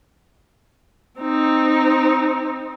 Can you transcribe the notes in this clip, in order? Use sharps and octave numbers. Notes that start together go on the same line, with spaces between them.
C4 D#4